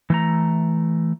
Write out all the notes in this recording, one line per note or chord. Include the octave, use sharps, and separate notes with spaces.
E3 A3 A#5